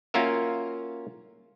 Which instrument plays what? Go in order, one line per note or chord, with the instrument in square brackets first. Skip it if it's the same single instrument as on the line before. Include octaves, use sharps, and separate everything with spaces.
[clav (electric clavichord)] A#3 C#4 F4 F#4 A#4 E5